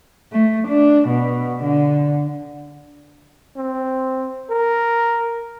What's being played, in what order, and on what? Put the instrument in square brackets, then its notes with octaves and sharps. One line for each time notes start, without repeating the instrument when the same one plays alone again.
[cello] A3
D4
B2
D3
[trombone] C4
A#4